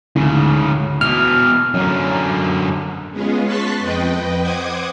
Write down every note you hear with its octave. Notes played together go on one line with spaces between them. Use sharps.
D2 G#2 C#3
B2 E3 F6
F#2 D3 C#5 A#5
G#3 B3 C#4 F4 G#4
A5 C6 C#6 F#6 A6 B6
F2 B4 D#5 G5
C5 F#5 D6 D#6 G#6